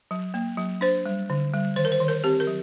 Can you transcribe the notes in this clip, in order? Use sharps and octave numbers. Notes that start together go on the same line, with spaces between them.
F#3
A#3
F#3
D4 C5
G3
D3
G3
D#3 C5
A#4
C5
D#3
A#4
C4 G4
A#4
F#3